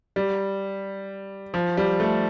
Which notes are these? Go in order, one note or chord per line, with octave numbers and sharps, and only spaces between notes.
G3
F3
G3
A3